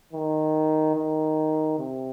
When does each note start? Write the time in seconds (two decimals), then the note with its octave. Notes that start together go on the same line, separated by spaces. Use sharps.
0.13 D#3
0.95 D#3
1.79 C3